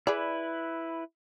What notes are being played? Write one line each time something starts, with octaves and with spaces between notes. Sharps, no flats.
E4 G#4 B4 D5